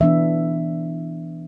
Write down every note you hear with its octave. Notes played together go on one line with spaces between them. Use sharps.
E3 B3 D4 E5